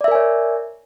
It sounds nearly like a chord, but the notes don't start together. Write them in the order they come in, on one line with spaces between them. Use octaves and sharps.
D5 E5 A#4 G#5 C#5